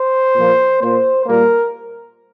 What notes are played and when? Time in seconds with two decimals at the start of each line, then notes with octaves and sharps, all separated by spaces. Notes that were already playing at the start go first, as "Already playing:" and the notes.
Already playing: C5
0.36 A#2 F3 A#3
0.81 A#2 A#3 C5
1.26 A#2 G3 A#3 A#4